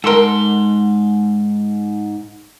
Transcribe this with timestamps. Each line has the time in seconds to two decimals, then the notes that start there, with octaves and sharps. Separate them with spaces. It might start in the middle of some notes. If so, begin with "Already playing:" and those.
0.04 G#2 A4 A#4 C6